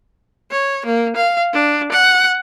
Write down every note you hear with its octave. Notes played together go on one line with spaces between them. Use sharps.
C#5
A#3
F5
D4
F#5